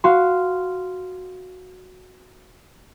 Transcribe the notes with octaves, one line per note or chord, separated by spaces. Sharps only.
F#4 F5 C6